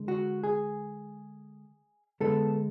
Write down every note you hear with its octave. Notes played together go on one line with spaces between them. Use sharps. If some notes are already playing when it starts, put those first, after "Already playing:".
Already playing: D3 G#3
F#4
G#4
D3 G#3 B3 A4